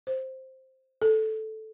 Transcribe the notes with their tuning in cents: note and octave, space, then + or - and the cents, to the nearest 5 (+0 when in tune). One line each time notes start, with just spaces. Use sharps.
C5 +5
A4 -5